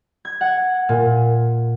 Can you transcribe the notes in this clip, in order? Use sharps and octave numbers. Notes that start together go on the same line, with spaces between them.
G#6
F#5
A#2